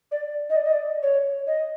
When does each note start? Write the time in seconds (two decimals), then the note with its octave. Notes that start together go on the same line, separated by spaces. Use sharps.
0.11 D5
0.50 D#5
0.56 D5
0.64 D#5
0.73 D5
1.03 C#5
1.47 D#5